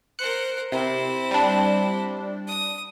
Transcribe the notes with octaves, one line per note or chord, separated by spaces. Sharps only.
A#4 C5 F#6 C#7
C3 C4 E4
G3 D4
D#6